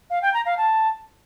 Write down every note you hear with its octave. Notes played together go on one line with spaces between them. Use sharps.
F5
G5
A#5
F5
A5